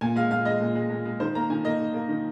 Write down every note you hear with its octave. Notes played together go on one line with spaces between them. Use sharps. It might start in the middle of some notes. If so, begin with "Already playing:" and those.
A#2 G#5
G#3 F5
A#2 F5
G#3 D#5
A#2
G#3
A#2
G#3
D#3 C5
A#3 A#5
D#3 G#5
A#3 D#5
D#3
A#3
D#3